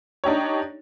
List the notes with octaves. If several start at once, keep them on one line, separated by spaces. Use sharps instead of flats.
D4 D#4 G4 C#5